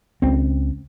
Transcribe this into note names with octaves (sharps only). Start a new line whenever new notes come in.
C#2 C4